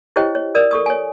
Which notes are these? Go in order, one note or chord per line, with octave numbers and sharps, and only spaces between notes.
E4 G4 C5 C#5 D#5 G5
C#5
A#4 D5 D#6
A4 C#6 D#6
C#5 G#5